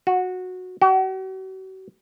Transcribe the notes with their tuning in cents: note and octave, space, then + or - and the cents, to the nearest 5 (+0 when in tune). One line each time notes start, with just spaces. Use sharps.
F#4 -15
F#4 +40